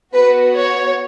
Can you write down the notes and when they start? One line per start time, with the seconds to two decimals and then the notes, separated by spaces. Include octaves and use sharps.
0.13 B3 F#4 B4
0.54 C#5